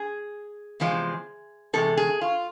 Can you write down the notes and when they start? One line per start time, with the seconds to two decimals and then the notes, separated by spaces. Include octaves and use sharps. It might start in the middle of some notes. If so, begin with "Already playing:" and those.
Already playing: G#4
0.80 E2 C3 F3 G#3
1.73 E2 C3 G#3 A4
1.97 G#4
2.21 F4